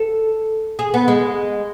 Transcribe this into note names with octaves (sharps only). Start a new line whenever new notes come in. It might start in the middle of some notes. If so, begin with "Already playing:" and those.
Already playing: A4
G#4
B3
G#3